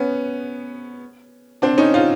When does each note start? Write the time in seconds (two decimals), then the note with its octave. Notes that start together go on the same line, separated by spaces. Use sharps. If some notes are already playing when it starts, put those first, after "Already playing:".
Already playing: B3 C#4
1.62 C4 D4
1.78 C#4 D#4
1.94 D#4 F4